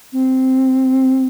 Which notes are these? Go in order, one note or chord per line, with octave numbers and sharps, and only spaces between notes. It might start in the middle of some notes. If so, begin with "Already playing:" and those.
C4